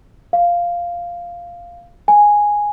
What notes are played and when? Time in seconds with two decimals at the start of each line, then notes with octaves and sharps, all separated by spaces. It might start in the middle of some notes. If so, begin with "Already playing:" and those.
0.33 F5
2.08 G#5